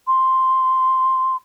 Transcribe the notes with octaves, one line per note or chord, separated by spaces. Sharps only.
C6